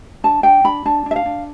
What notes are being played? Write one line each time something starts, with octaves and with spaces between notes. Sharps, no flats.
D4 A5
D4 G5
D4 B5
D4 A5
D4 E5
F5
D4